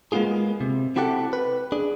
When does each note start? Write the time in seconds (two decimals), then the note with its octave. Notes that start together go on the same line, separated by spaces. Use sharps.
0.12 G#3 A#3 B3 D4 F4 G#4
0.61 C3
0.96 C4 E4 F#4 G4 A4 F#5
1.33 B4
1.72 D4 G#4